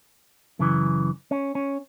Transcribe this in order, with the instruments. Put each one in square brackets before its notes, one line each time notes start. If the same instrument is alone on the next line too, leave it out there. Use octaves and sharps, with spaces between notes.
[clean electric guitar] F#2 C#3 E3
C#4
C#4